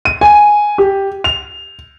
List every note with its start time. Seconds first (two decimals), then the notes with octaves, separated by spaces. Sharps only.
0.05 D#7
0.21 G#5
0.78 G4
1.24 F7